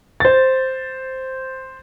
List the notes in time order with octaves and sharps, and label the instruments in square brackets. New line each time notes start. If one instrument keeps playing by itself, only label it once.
[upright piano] C5 A6